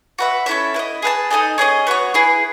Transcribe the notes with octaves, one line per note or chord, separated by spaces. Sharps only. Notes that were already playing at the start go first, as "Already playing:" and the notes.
F#4 B4 E5
C#4 E4 A4 E5
E4 B4 D#5
G#4 B4 F#5 A5
D#4 A4 D#5 G#5
C#4 G#4 B4 D#5
B3 F#4 C#5
E4 G#4 B4